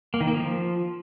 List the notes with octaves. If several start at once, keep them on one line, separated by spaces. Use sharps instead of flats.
A#3
D#3
A#3
F3